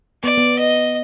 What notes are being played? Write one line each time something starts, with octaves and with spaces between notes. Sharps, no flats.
B3 D5
B3
D#5